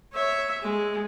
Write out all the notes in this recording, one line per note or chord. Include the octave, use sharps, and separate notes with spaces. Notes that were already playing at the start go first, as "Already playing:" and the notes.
C#5 E5
G#3